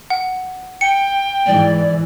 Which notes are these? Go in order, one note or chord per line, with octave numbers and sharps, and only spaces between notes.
F#5
G5 C#7
G#2 E3 D5